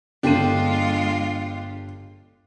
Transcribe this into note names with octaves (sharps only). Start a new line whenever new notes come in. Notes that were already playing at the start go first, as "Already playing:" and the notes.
G1 G#3 D4 F4 G4 A4 D#7